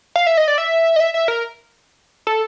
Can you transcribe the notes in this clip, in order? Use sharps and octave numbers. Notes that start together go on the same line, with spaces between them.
F5
E5
D#5
D5
E5
D#5
E5
E5
A#4
A4